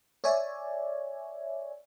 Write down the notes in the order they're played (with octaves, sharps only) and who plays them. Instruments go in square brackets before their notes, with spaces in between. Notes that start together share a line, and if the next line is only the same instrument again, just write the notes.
[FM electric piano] C#5 D5 E5 G#5